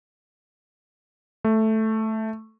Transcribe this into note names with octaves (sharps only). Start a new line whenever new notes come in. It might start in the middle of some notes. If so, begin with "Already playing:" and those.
A3